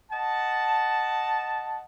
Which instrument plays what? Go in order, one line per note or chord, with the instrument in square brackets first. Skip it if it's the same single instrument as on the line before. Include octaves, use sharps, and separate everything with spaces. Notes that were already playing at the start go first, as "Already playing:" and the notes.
[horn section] D#5 F#5 A5